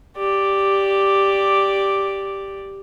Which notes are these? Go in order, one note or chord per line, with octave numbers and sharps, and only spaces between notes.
G4 D5